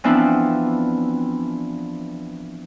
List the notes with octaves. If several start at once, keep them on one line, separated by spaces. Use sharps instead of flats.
E3 F3 B3 C4 D4 E4